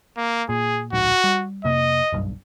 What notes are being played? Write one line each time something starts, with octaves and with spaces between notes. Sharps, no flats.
A#3
A#2 G#4
D1 A#1 G#2 F#4
G3
F1 C3 A#3 D#5
F#1 B1 G2